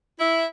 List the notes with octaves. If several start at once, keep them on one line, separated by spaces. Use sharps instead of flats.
E4